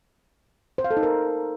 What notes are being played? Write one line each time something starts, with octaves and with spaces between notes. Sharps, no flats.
C5
F5
A4
D#4
A#4